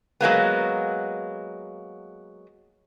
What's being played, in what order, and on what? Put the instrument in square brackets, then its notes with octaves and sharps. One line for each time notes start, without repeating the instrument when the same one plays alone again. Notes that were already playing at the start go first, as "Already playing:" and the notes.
[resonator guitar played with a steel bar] F#3 G#3 A#3 B3